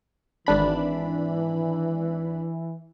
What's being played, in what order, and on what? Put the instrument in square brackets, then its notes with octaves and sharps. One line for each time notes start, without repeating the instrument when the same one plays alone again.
[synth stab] G#1 D4 B5 [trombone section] E3